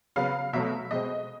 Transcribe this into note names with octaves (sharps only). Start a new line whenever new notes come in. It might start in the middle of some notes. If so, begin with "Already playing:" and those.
C#3 F#3 B3 F5
B2 F#3 A3 E5
B2 G#3 C4 D#5